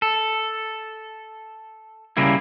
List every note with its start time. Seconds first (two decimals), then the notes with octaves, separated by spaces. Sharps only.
0.02 A4
2.17 C#3 G3 A#3 E4